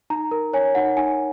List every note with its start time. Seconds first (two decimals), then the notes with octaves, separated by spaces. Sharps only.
0.10 D#4 A#5
0.31 A#4
0.53 C#5 G#5
0.75 D#4 F#5
0.97 D#4 G#5